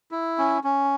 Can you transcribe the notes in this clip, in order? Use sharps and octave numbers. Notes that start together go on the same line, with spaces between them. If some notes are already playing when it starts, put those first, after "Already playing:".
E4
C#4
C#4